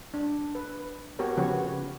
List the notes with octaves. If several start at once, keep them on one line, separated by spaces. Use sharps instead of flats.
D4
B4
B3 F#4 G4 A#4 C#5
C#3 F3 B3 F#4 G4 C#5